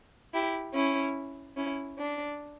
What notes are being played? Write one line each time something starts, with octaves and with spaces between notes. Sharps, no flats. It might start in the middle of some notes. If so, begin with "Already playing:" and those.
E4 G4
C#4 E4
C#4 E4
D4